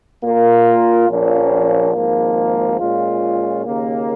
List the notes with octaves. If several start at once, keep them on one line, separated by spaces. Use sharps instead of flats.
A#2 A#3 F4 A#4
A#1 A#2 F3 A#3 C#4
G#1 G#2 F3 A#3
A#2 G#3 C#4 F4
D#2 C#3 A#3